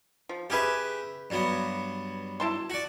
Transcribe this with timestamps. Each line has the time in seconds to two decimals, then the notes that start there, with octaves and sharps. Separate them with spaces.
0.29 F3
0.50 C#3 G4 G#4 B4 E5
1.30 G2 F#3 B3
2.40 E4 A5 C6
2.70 F#4 D5